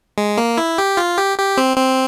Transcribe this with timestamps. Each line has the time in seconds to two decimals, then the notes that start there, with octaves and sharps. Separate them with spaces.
0.18 G#3
0.37 A#3
0.58 E4
0.78 G4
0.97 F4
1.18 G4
1.38 G4
1.57 C4
1.77 C4